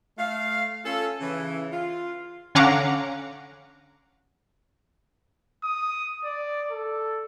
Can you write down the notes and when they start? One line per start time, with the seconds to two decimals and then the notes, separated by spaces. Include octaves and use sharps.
0.18 A3 F5
0.85 C#4 F4 A4
1.21 C#3 E3
1.72 F4
2.55 D3 C#4 F5 F#5 A#5 D6
5.64 D#6
6.24 D5
6.71 A4